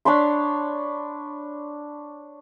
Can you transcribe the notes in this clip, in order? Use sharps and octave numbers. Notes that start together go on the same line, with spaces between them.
D4 C#5 B5 C6